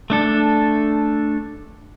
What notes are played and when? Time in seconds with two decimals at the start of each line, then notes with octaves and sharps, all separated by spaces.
0.10 A3 D4 A4